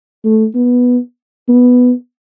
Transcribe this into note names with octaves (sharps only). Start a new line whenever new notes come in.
A3
B3
B3